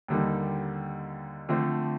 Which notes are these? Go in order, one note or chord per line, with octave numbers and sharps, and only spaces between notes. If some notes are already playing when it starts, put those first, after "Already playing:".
D#2 D3 G3 A#3 D#4
D3 F3 A3 C4